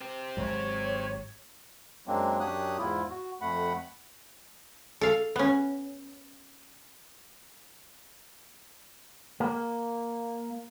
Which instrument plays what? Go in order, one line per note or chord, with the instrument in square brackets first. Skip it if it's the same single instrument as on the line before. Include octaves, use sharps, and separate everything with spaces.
[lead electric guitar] C4 G4
[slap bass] G#1 G#2 F#3 [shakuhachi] C#5
[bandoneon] F#2 F#3 G#3 A#3 C4 D4
F#2 D4 G4 C#5 D#6 F#6
E2 G#2 E4 F4
F#4
F2 A3 F#5 B5
[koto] A4 F5
B3 C#4
[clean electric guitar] A#3